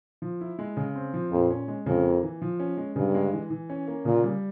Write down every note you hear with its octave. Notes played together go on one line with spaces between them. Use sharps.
F3
E4
G#3
C#3
C4
F3
F2 A#2
C#4
G#3
F2 C#3
A#3
E3
F3
C#4
G#3
G2 C#3
G#3
E3
E3
C#4
A#3
A#2 C#3
G3